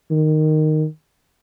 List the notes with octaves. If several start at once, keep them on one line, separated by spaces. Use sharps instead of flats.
D#3